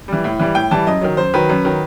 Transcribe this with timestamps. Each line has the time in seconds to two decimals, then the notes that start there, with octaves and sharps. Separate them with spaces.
0.08 E3 G3
0.24 A2
0.39 E3 G3
0.55 A2 G5
0.71 E3 G3 A5
0.87 F#2 D#5
1.01 D#3 F#3
1.17 F#2 C5
1.34 D#3 F#3 B4
1.50 F#2
1.65 D#3 F#3